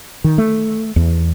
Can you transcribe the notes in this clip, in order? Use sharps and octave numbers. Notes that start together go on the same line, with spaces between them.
D#3
A3
E2